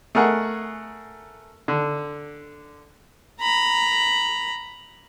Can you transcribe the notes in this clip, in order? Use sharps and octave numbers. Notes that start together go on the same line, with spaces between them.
A3 G#4 A#4 F#5
D3
A#5 B5